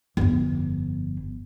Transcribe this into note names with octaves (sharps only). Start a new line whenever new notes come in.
G1 F2